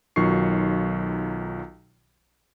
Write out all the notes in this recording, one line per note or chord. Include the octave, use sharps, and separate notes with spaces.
B1 D#3 F#3 F4 C#6 C7